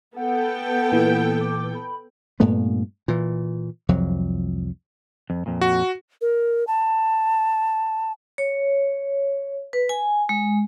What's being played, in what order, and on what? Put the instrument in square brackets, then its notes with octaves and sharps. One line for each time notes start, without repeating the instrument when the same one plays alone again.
[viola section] B3 A4 G5 [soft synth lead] F#5
[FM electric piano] A#2 E3
[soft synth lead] D6
B5
[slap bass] G2 A#2 A3 B3
A#2 E3
C2 F2 F3 F#3
[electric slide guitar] F2
F2 A#2
[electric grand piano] F#4
[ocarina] A#4
A5
[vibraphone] C#5
B4
G#5
G#3